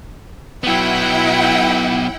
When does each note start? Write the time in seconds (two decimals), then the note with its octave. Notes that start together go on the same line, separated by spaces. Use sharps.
0.64 F#3 B3 E4 F#5 G5